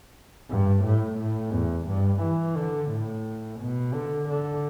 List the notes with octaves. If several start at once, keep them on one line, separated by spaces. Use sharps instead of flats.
G2
A2
A2
E2
G2
E3
D3
A2
B2
D3
D3